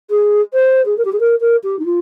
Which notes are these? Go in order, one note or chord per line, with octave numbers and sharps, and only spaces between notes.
G#4
C5
G#4
A#4
G4
G#4
A#4
A#4
G4
D#4
F4